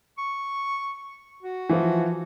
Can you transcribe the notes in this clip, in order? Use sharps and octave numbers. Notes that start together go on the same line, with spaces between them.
C#6
F#4
E3 F3